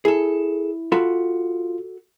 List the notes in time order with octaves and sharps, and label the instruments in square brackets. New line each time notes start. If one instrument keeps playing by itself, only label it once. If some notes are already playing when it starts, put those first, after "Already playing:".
[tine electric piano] E4 [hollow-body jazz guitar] G#4 A4
[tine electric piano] F4 [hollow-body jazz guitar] F#4 A4 B5